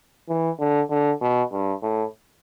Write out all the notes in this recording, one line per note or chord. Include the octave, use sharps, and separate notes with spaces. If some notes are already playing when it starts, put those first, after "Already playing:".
E3
D3
D3
B2
G2
A2